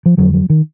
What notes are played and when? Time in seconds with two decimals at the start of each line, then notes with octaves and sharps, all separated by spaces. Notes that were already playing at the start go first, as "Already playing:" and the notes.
0.06 F3
0.17 F2 D3 F#3
0.34 F#3
0.50 D#3